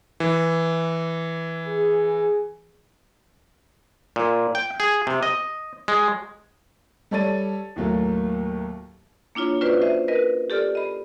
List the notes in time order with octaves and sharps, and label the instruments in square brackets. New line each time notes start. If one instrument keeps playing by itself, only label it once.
[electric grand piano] E3
[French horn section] G#4
[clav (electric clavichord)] A#2
G5
G#4
C3
D#5
G#3
[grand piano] G3 A4 C#5 D5 A6 D#7
D#2 A2 F#3 A3 A#3
[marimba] A#3 D4 E4 F4 C#5
C#4 F4 F#4 B4 C5 D5
C5 D#5 E5
A#4 B4 D#5
G4 A4 D5 F6
D#5 B5